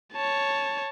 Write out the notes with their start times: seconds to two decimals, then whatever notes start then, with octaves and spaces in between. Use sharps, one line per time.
0.13 C#5 A5